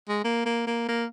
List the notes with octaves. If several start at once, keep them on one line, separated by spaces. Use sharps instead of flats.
G#3
A#3
A#3
A#3
A#3